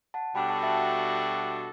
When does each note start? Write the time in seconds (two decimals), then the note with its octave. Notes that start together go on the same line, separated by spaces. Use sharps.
0.14 F#5 A5
0.35 B2 G3 D4 F#4 A4 G5 B5
0.49 F#5 A5
0.63 E5 G5